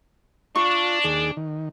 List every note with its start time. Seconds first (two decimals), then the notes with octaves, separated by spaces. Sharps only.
0.56 D4 F4 C#6
1.04 D#2 G#4 D6
1.37 D#3